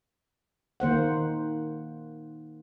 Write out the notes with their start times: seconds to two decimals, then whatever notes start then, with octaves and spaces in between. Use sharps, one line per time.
0.80 D#3 A#3 C5 F#5